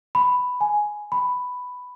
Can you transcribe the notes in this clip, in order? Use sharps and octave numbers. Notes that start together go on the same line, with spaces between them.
B5
G#5
B5